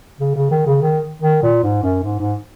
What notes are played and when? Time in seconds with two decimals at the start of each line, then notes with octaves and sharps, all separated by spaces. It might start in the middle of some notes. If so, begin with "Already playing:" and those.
0.20 C#3
0.35 C#3
0.51 D#3
0.67 C#3
0.82 D#3
1.22 D#3
1.43 A#2
1.63 G#2
1.83 F#2
2.04 G#2
2.20 G#2